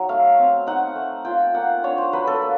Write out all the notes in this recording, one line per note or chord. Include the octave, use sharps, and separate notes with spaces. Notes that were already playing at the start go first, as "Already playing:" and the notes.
Already playing: F#3 D#4
A3 F5
C4
D#4 F#5
A3
F4 G5
A#3 F#5
D4 C#5
C5
F#3 B4
A4
A#3